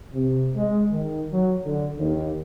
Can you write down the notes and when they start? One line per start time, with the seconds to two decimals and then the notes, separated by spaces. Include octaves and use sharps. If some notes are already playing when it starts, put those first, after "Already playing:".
0.14 C3
0.56 G#3
0.92 D#3
1.32 F#3
1.65 D3
1.99 D#2